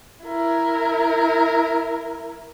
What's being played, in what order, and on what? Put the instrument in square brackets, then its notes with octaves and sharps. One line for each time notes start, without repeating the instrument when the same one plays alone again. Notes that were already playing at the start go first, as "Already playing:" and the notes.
[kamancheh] E4 A#4